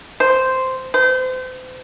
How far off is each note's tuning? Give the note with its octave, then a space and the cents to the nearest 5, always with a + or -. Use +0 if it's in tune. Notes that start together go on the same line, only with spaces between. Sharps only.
C5 -5
C5 -35